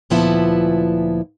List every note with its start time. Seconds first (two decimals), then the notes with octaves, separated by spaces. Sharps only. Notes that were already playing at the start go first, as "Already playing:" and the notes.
0.10 D2 A#2 F3 B3 E4 A5